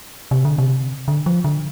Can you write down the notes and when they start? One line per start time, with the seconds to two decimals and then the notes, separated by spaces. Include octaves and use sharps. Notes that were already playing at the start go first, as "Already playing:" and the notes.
0.31 C3
0.45 D3
0.58 C3
1.08 D3
1.26 F3
1.44 D3